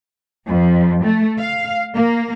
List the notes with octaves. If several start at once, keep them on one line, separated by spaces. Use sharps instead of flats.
F2
A3
F5
A#3